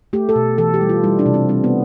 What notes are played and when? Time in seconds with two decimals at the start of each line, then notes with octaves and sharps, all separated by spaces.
0.13 A3 G4
0.29 A4
0.36 B2
0.58 E3 A4
0.74 G4
0.81 G3
0.89 F4
1.04 G3 E4
1.19 D4
1.26 C3
1.34 C4
1.49 G3 C4
1.64 B3